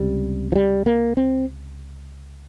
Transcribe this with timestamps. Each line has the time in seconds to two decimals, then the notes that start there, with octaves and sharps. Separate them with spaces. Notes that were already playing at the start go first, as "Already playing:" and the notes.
Already playing: C#2 C3 G3
0.52 F3
0.55 G3
0.86 A#3
1.17 C4